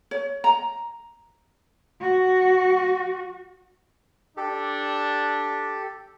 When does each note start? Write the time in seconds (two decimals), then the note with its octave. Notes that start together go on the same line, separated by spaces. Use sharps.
0.11 C#5
0.44 A#5
2.01 F#4
4.37 D4 G4 A4